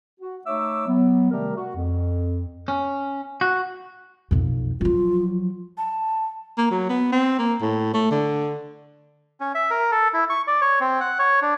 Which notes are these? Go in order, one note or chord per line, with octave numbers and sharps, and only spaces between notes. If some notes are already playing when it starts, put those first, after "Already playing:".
F#4
A3 D#4 C#5 E5 D6 E6
F#3 B3
C3 D#3 G3 A3 G4 A#4
F#4
F2
C#4
F#4
B1 F2
F3 F#3 F4
A5
A#3
F#3
B3
C4
A#3
A2
A3
D3
C#4
E5
A#4
A4
E4
C#6
D5
C#5
C4
F#5
C#5
D4